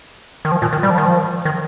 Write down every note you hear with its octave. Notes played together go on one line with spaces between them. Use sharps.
D#3
F3
A#2
D#3
G3
F3
D#3
F3
D#3